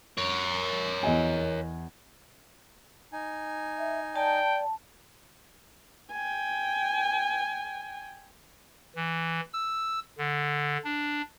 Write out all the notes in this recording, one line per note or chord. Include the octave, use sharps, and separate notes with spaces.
A#4 C#5
E2 D#5 G#5
D#4 G#5
E5
D5 G5 A5
G5 G#5
E3
E6
D3
D4